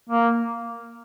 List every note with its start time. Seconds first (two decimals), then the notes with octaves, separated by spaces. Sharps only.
0.09 A#3